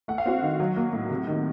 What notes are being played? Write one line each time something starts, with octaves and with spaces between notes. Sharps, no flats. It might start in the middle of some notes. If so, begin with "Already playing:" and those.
A3 F#5
F5
C4 F#4 F#5
D#3
F#3
A#3
A2
C3
D#3